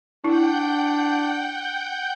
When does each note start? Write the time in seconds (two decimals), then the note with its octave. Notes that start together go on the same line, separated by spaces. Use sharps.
0.24 D4 E4 F#5 G5 G6